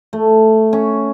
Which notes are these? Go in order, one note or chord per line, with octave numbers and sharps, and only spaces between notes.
A3
C#4